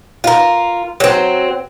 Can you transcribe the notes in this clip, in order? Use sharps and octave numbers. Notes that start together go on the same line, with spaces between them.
F4 A#4
F#3 C4